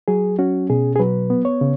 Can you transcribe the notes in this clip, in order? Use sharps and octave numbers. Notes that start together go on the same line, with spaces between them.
F#3 G#4
C#4 F#4
B2 G#4
G#4
F#3 B4
B3
C#5
C#3